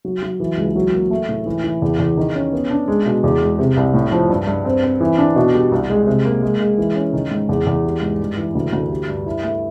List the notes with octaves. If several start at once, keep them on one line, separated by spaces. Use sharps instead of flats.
F#3
F#3
E3
C#2
F#3
A#3
A3
A2
E3
E3
E2
E2
D#3
C#4
B3
D4
G#3
B2
E2
G#3
C3
C2
A2
F3
G2
G2
C4
C4
E3
D4
B2
G3
C2
G#3
C3
A#3
G#3
G#3
E3
C#4
D#3
G#2
E2
E2
G3
G#2
G2
E3
D2
D2
G3
G2
E4
A3